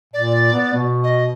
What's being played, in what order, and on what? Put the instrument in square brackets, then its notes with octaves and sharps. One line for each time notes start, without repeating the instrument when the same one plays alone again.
[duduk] A#2 [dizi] D5
[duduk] B3
B2
[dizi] D#5